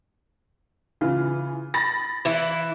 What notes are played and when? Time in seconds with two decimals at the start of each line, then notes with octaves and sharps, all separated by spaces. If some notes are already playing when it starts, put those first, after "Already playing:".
1.01 C#3 E3 F4
1.74 B5 A6 A#6
2.25 E3 E4